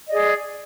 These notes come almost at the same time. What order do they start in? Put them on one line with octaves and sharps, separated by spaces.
D#5 D5 G#4